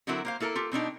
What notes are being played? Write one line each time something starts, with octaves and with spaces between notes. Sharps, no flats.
D3 F#3 C4 E4 F#4 A#4
A#3 C5 F5
A#3 E4 A4 A#4
F4 G4 A4
B2 C4 D4 D#4